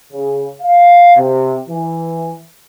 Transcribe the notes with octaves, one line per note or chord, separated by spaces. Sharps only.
C#3
F5
C3
E3